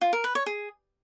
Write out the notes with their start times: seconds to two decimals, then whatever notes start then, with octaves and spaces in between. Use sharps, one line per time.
0.01 F4
0.13 A#4
0.24 B4
0.35 C#5
0.46 G#4